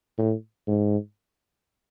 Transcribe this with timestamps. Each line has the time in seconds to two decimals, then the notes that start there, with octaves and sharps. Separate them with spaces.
0.18 A2
0.67 G#2